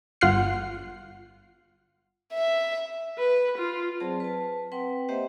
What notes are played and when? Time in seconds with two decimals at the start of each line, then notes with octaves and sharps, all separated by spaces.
0.21 G1 F4 F#5 F6 C7
2.34 E5
3.18 B4
3.58 F4
4.00 F#3 C4 G#4 C5 D5 A5
4.20 B4 A5
4.72 C4 B4 F#5 G5 C6
5.09 A#3 G4 C5 D#5 E5 F#5